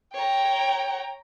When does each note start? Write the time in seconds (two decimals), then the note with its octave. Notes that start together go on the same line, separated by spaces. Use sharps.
0.14 C#5 G5 A#5